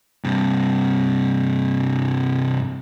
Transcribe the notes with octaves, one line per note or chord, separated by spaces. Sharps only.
G2 C3